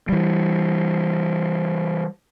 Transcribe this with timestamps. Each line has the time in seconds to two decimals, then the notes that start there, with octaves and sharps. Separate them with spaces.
0.09 E3 G3